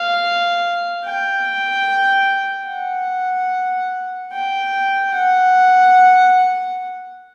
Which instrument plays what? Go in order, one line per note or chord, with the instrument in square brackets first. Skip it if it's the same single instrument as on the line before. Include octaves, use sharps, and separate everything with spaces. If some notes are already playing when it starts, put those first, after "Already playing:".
Already playing: [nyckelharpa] F5
G5
F#5
G5
F#5